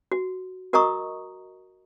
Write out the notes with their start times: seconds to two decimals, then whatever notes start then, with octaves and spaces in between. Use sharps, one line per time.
0.12 F#4
0.73 F#4 A#4 D#5 A#5 C#6 D#6